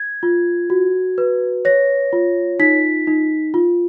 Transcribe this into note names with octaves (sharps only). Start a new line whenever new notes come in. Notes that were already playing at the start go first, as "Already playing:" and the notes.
Already playing: G#6
F4
F#4
B4
C#5 A#6
F4
D#4 B6
D#4
F4